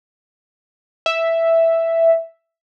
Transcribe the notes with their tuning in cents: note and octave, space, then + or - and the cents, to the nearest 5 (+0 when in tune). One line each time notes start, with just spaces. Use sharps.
E5 +0